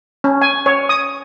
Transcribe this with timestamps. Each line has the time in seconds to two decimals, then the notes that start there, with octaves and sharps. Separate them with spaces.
0.24 C#4
0.42 G#5
0.66 C#5
0.89 D#6